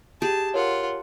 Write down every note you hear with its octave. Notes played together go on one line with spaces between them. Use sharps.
G4 G#4 A5
F4 A#4 C#5 F#5